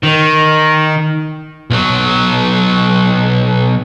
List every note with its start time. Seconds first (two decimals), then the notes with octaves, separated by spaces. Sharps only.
0.04 D#3
1.71 B1 F#3